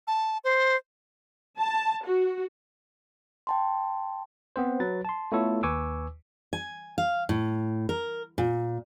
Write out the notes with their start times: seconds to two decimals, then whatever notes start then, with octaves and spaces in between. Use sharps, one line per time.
0.07 A5
0.44 C5
1.58 A5
2.05 F#4
3.47 G5 A5 C6
4.56 B3 C4 C5
4.80 F#3 B4 A6
5.05 A5 C6
5.32 A3 B3 E4 F4 A4 C#5
5.63 D#2 B4 G#5 C#6 D6 E6
6.53 G#5
6.98 F5
7.29 A2
7.89 A#4
8.38 A#2